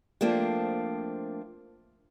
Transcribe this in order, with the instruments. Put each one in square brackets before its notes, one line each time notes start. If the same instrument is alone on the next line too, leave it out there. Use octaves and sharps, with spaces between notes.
[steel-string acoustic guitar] F3 A3 A#3 C4 D4